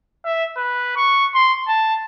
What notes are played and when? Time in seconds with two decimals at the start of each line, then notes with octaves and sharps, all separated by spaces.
0.25 E5
0.57 B4
0.96 C#6
1.34 C6
1.68 A5